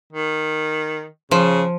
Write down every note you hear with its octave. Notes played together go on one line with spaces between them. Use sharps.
D#3
C#3 F3